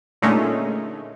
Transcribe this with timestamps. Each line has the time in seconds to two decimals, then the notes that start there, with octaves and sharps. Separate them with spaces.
0.22 A#2 D3 G#3 A3 C#4 D#4